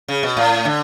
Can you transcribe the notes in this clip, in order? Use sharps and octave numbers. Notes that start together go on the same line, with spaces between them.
C#3
B2
A2
D3